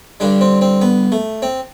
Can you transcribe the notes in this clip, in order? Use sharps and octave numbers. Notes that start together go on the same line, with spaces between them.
G2 D3 G3 D4
C4
C4
B3
A3
C4